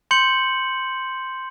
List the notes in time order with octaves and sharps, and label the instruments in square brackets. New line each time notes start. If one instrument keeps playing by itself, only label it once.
[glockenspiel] C6 G6 C#7 F#7